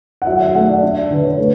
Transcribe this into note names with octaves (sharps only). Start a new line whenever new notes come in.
F#5
F#3 E5
F#5
E5
A3 F#5
D5
D4 E5
D5
D3 B4
C#5
A3 B4